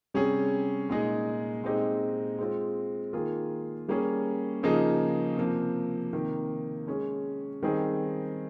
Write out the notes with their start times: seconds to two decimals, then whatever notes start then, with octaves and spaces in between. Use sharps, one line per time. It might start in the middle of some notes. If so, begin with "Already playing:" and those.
0.14 C3 G3 C#4 G#4
0.89 A#2 G#3 D#4 G#4
1.64 A#2 G#3 C4 D#4 G4
2.38 G#3 C4 F4
3.13 D#3 A#3 F4 G#4
3.89 G3 A#3 C#4 G#4
4.63 C#3 F3 A#3 D#4 G#4
5.37 C3 F3 A#3
6.13 C3 D#3 A#3
6.87 G#3 C#4 G#4
7.62 D#3 G3 C4 D#4 G#4